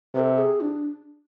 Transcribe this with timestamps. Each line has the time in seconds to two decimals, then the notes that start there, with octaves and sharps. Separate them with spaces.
0.14 C3 B4
0.20 A4
0.38 G#4
0.61 D4